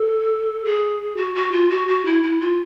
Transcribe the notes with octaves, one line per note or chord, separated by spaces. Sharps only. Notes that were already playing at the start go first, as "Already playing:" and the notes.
Already playing: A4
G#4
F#4
F#4
F4
F#4
F#4
E4
E4
F4